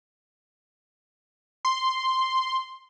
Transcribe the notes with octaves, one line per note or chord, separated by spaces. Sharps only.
C6